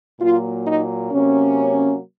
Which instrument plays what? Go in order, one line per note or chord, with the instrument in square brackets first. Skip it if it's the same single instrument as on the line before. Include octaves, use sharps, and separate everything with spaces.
[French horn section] A#2 F#3 A#3 F4
D#4
C3 F#3 A#3 C#4